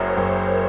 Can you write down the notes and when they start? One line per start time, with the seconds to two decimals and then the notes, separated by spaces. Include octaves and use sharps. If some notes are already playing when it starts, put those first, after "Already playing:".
Already playing: F#1 F#2 A#4 C5 C#5
0.17 F#1